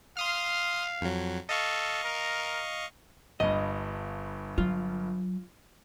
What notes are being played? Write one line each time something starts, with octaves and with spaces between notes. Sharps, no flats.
F5 C6 D#6 F6
F2 F#3
A4 D#5 F5 C#6
A#4
G1 G2 D#5
F#3 F4